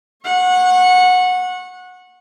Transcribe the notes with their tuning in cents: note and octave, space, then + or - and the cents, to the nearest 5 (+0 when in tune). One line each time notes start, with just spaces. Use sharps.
F#5 -20 C#6 -30